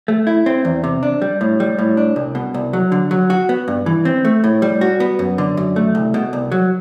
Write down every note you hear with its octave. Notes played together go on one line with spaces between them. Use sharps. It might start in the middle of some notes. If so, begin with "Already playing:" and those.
A3
E4
C4
E2
C3
D4
G3
A2
G3
A2
D4
C2
B2
C2
F#3
D3
F#3
F#4
B3
G2
E3
C4
A3
A2
G3
F#4
B3
F#2
D3
F#2
A3
C2
B2
C2
F#3